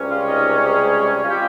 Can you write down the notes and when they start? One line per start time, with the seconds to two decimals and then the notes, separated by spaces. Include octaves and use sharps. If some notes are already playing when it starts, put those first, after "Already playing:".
Already playing: C#2 C3 G3 C#4
0.09 F4 F5
0.27 D#4 D#5
0.61 G#3 G#4
1.23 F4
1.30 C3 F3 G3 G#3 C4 G4